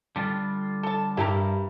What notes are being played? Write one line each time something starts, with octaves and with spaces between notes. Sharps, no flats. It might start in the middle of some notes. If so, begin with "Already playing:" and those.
D3 G3 F4 A4
A4 A5
G2 E4 G4 A#4